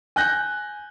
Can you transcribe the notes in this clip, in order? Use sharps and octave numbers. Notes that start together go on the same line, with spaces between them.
G#5 F#6 G6 A#6